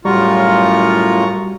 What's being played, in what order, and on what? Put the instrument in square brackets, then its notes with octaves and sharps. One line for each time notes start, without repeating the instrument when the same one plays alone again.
[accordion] F#2 A2 F4 [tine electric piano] G3 F#4 [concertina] A#5 C#6